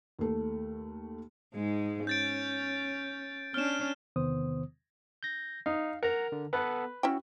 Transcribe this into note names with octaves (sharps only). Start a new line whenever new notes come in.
D#2 A3
G#2 G#3
C#4 G6 A6 D7
C#4 D4 F6 E7
E2 C3 D#3 B3 C5 D#6
G6 A#6
D#4 F5
A#4 F#5 A#5
D3
B3 A4 B4 F#5
C#4 E4 F#4 G5